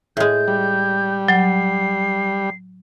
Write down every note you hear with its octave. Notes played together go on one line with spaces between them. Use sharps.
A2 G#3 G6
G3
F#3 C7